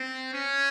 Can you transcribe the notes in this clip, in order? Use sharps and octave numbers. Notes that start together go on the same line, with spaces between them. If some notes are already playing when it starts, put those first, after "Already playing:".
Already playing: C4
C#4